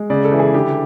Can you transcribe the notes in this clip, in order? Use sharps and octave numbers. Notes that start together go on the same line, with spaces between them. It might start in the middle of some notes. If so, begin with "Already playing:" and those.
Already playing: G#3
C#3 D5
A4
E3
G#4
D3 G4